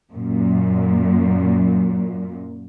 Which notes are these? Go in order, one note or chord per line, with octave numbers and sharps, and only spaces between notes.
F#2 A#2